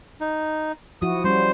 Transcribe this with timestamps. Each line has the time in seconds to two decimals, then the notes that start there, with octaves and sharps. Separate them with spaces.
0.21 D#4
1.02 F3 E4 F#4 D#6
1.24 G3 C#4 C5